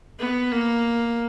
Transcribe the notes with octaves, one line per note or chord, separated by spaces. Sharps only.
B3
A#3